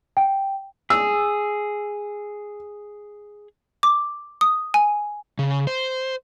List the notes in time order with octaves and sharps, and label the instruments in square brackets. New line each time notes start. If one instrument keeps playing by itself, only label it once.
[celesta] G5
[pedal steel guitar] G#4 [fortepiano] E6
[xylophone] D6
D#6
G#5
[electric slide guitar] C#3
C5